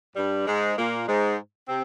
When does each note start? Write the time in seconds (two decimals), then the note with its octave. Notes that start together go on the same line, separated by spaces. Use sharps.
0.16 G2 G3
0.46 G#2 G#3
0.78 A#2 A#3
1.08 G#2 G#3
1.68 C3 C4